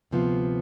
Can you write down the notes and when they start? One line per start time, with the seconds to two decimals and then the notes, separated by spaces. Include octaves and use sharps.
0.11 D2 C3 F3 B3 F4